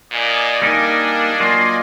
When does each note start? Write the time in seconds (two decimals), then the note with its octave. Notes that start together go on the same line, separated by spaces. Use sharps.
0.11 A#2 D5 D#5 G#5
0.62 G3 A#3 D4 D#4
1.40 F#3 A#3 F4